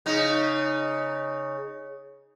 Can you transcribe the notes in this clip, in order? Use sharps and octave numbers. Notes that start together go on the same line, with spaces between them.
C#3 D#4